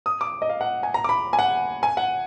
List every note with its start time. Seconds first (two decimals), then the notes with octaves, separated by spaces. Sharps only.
0.06 D#6
0.21 D6
0.42 D#5
0.49 F5
0.61 F#5
0.83 G#5
0.94 A#5
1.04 D6
1.09 B5
1.33 G#5
1.39 F#5
1.83 G#5
1.97 F#5